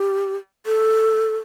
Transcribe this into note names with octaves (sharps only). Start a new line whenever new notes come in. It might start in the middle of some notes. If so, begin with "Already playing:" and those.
Already playing: G4
A4